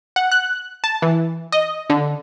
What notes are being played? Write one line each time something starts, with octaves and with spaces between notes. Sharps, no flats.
F#5
F#6
A5
E3
D#5
D3